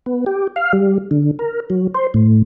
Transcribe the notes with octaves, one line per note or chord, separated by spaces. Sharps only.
B3
G4
F5
G3
D3
A#4
F#3
C5
A2